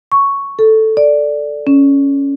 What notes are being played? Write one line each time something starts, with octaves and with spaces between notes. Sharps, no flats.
C#6
A4
D5
C#4